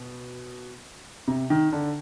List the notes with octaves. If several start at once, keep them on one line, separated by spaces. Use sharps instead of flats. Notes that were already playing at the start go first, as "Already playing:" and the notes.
Already playing: B2
C3
D#3
D3